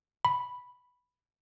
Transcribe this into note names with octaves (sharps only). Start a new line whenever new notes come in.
B5